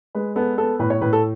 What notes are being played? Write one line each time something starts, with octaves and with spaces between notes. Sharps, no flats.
G#3 B4
B3 A4
B3 A4
A2 B4
C#5
A2 B4
A4